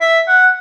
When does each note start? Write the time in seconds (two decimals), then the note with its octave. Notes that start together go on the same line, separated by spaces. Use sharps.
0.01 E5
0.28 F#5